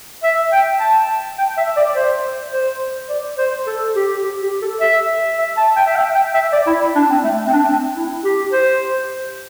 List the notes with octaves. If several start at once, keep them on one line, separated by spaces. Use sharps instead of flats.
E5
G5
A5
G5
E5
D5
C5
C5
D5
C5
A4
G4
G4
G4
A4
E5
E5
A5
G5
E5
G5
G5
E5
D5
E4
D4
C4
A3
C4
D4
C4
E4
G4
C5